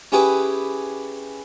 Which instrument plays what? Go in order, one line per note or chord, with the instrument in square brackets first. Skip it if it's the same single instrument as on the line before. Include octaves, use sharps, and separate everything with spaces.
[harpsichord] C#4 E4 G4 G#4 B4